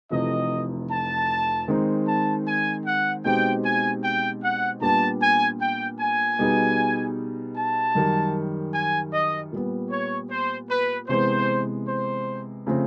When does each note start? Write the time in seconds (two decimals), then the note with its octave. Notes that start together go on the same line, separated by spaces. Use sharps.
0.10 F1 F2 C3 E3 D#5
0.90 A5
1.68 D#3 G#3 C4 D#4
2.07 A5
2.47 G#5
2.85 F#5
3.24 B2 G#3 C4 D#4 G4 G5
3.64 G#5
4.03 G5
4.43 F#5
4.81 A#2 G3 B3 D4 G4 A5
5.21 G#5
5.60 G5
6.00 G#5
6.39 B2 G3 B3 D#4 G#4
7.56 A5
7.95 F#2 D#3 G3
8.73 G#5
9.13 D#5
9.52 A#2 G3 B3
9.90 C#5
10.30 C5
10.70 B4
11.08 C3 E3 G#3 B3 C5
11.87 C5
12.67 C#3 F3 A3 C4